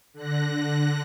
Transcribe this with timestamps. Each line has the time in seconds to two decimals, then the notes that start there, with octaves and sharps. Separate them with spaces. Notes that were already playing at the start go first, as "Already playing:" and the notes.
0.14 D3 F#6 A#6